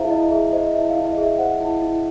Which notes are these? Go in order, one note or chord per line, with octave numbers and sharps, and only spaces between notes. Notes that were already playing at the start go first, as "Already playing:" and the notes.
Already playing: E4 G#4 C5 E5 F5 A#5
E4 D#5
G#4 E5
C5 D#5
E4 E5
F5
E4
D#5
G#4 E5
C5 F#5
E4
E4